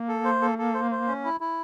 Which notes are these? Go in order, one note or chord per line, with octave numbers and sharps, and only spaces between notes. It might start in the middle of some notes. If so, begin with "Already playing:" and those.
Already playing: A#3
A4
C5
A4
A4
C5
C5
C#4
E4
E4